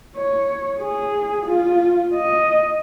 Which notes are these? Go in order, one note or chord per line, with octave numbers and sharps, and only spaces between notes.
C#5
G#4
F4
D#5